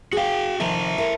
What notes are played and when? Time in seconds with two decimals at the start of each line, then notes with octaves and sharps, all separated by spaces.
0.13 F#4 G#4 F5 G5
0.60 C3 D#3 F3 E5 A5 A#5
0.98 E4 A#4 C5